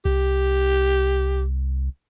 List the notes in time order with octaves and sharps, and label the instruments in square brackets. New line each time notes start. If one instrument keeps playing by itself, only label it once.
[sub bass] C2 [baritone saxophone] G4